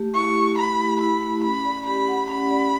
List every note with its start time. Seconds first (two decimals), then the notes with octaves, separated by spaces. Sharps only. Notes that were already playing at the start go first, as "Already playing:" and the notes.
Already playing: A3 G4
0.14 E4 C#6
0.36 A3
0.58 A3 B5
0.79 G4
1.00 E4 B5
1.22 A3
1.43 C#4 B5
1.65 D5
1.86 G4 B5
2.08 F#5
2.29 C#4 B5
2.51 D5